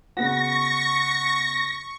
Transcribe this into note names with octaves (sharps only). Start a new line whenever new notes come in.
C#3 B3 F#4 C#6 A#6